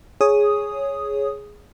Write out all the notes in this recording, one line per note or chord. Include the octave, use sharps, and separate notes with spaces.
G#4 C#5 D#6